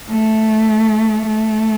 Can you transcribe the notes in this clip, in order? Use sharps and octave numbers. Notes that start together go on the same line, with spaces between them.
A3
A3